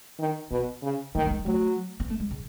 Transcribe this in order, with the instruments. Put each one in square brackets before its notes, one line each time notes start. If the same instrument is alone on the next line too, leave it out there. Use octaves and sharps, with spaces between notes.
[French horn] D#3
[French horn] B2 [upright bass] B3
[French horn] C#3
[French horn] D#3 [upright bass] A3
[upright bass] F#3
G#3
[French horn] F#3 [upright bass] A3
[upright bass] B3
A3
G#3
C#3